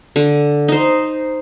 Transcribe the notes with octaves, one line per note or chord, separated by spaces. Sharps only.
D3
D#4 C5